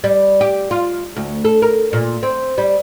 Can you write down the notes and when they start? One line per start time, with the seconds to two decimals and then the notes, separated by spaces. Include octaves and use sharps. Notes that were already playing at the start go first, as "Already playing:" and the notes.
0.04 G3
0.41 G4
0.71 F4
1.16 D2
1.45 A4
1.62 A#4
1.93 A#2
2.23 C4
2.58 G3